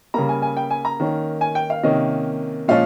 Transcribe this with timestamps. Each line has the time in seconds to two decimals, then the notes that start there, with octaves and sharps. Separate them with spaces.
0.14 C#3 G3 A#3 A#5
0.29 G#5
0.42 G#5
0.57 G5
0.70 G#5
0.85 A#5
1.00 D#3 A#3 C#4
1.41 G#5
1.55 G5
1.70 F5
1.83 C3 D#3 A#3 C#4 D#5
2.68 A#2 F3 G#3 C#4 F5